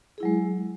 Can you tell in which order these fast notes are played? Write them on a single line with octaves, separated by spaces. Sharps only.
G#4 E4 F#3 G#3